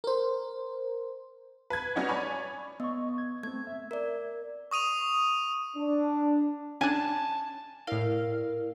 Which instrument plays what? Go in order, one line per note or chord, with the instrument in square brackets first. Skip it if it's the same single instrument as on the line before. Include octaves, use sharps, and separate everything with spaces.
[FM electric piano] A#4 C5
[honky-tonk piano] B4 G#6
G3 C#4 D#4 F#4 C#5
C#5 D5 G#5 B5 C#6
[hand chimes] B3 [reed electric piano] D#5 C#6
[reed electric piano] G#6
[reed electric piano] A3 C4 [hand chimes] G#6
[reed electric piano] E5
[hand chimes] A#4 D5
[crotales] C#6 D#6 D#7 F7
[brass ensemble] D4
[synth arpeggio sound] C#4 D4 [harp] G#5 [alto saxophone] A5
[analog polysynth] A2 F5 [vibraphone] E4 A#4 D5